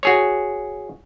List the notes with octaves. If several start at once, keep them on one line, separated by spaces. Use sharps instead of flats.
F#4 G#4 C#5